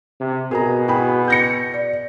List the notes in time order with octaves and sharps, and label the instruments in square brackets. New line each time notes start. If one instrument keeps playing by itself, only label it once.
[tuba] C3
[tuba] B2 [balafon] F#4 A#4 [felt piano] G#4 A#5
[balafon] E4 F#4 [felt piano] G#4 G5 B5
[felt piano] G6 A#6 C#7
[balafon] D5